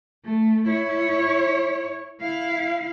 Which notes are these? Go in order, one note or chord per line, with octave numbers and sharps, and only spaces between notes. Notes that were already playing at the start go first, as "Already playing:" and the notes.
A3
E4 C#5
E4 F5